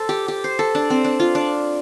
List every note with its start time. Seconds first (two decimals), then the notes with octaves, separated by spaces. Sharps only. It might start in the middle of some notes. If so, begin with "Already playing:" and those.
Already playing: A4 C5
0.09 G4
0.28 G4
0.44 C5
0.59 A4
0.75 D4
0.90 C4
1.04 D4
1.20 F4
1.35 D4